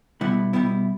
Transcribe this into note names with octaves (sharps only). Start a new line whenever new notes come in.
B2 G3 B3 E4
B2 G3 B3 E4